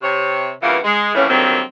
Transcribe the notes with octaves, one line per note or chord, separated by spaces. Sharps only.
C3 C#5
G2 C#3 E3 A#3 B3 F4
G#3
F2 A2 E3 A#3 C#4
D3 D#3 F#3 G3 A#3 C4